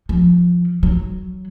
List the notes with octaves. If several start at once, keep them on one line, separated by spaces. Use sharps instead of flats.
F3
F#3